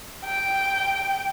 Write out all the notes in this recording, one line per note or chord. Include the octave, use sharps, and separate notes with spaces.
G5